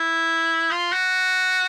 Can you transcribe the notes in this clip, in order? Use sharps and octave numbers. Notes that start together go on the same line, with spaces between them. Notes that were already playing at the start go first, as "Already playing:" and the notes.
Already playing: E4
F4
F#4